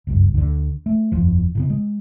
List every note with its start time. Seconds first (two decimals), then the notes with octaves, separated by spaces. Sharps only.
0.07 F#1 C#2 G2
0.34 D2 D3
0.86 A3
1.12 F#1 E2 F3
1.55 A2 C#3 B3
1.70 G#3